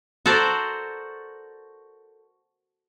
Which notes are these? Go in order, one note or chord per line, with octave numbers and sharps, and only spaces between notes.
F#4 A4 A#4 C5 D5